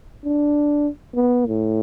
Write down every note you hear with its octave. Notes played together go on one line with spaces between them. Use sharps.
D4
B3
A2